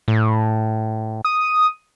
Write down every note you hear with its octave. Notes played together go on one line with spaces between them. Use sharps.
A2
D#6